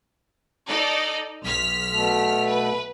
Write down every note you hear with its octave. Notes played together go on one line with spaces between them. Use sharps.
D#4 A4 D5
B1 F6 B6
B2 A3
B4